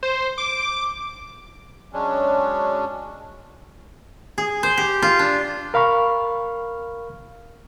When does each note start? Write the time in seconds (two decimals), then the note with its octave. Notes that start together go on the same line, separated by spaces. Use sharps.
0.03 C5
0.38 D6
1.93 F#3 G#3 C#4 D4
4.38 G#4
4.63 C5
4.78 G4
5.02 F4
5.19 D4
5.74 A#4 F5 B5 C#6 F6